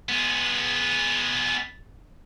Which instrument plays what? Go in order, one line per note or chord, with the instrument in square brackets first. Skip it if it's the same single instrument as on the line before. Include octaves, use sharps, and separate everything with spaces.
[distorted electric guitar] G#3 B3